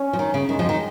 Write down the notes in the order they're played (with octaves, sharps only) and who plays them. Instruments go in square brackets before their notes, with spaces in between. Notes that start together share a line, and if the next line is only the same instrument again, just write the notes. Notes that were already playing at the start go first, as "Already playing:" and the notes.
Already playing: [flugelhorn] C#4
[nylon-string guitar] F3
D#3
C#3
[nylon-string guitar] D#3 [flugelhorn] G#3
[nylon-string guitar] F2 F3
D#3